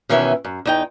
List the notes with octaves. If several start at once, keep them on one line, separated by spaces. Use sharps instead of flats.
B2 D#3 E3 C#4 E5
F#2
E2 D#4 G5